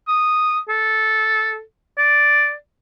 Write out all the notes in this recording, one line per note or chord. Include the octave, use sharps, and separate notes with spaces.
D#6
A4
D5